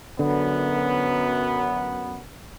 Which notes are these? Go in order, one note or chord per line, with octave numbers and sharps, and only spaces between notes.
F#2 D3 B3